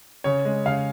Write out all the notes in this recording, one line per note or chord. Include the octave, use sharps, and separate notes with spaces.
C#3 C#5
G#3
C#3 F5